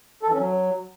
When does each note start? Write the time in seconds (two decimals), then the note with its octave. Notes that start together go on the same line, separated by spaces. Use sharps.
0.23 A4
0.28 E3
0.34 C#4
0.39 F#3